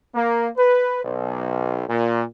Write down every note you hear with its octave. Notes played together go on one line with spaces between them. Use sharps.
A#3
B4
B1
A#2